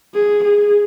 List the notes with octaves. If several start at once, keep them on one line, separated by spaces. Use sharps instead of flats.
G#4
G#4